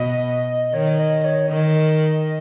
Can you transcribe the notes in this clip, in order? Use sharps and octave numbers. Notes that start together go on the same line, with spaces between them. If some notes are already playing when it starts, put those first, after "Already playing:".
Already playing: B2 D#5
D#3 C#5
D#5
C#5
D#3 D#5